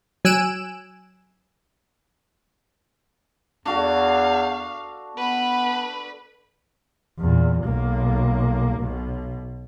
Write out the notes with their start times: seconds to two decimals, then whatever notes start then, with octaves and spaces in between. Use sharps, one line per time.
0.25 F#3 G#5 E6 F#6 D7 E7
3.65 E2 D4 F#4 A4 F5
5.17 B3 B4 B5
7.19 E2 A#2
7.65 B1 A#3
8.78 B1 B2